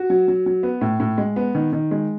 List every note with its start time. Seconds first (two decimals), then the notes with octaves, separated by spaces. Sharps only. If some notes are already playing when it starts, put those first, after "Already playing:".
Already playing: F#4
0.10 F#3
0.28 F#3
0.46 F#3
0.63 B3
0.81 A2
1.00 A2
1.18 G#3
1.36 B3
1.55 D#3
1.73 D#3
1.91 G#3